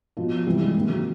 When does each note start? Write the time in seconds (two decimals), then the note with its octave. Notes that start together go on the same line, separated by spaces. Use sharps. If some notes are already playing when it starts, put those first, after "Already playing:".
0.17 B2 F3
0.47 C3 E3 G3
0.61 G#3
0.76 C3 D#3 A#3
0.89 F#3